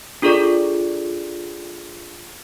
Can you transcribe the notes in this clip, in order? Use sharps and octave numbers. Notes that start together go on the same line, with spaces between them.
D4 F4 G#4 A4 D5